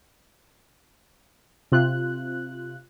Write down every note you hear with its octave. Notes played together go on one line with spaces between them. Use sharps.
C3 F4 F#6